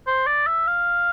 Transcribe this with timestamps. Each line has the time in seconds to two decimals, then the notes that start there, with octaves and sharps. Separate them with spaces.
0.07 C5
0.27 D5
0.47 E5
0.67 F5